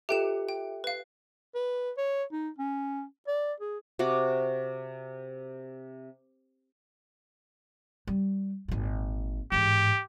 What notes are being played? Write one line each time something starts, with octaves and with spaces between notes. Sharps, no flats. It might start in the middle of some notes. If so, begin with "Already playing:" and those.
F4 G4 A4 E5 G5 E7
G5
B4 F5
B4
C#5
D#4
C#4
D5
G#4
C3 F#4 F#5 D6
G3
G#1 A#2
A1 G#2 G4